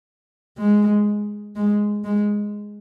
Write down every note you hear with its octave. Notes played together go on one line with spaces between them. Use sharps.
G#3
G#3
G#3